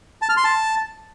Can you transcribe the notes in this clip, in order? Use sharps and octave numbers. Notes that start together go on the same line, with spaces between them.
A5
F6
C6
A5